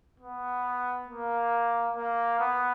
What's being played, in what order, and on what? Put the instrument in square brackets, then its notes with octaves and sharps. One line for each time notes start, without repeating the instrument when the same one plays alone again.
[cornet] B3
A#3
A#3
B3